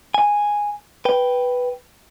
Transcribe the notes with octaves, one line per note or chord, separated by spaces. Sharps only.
G#5
B4 G5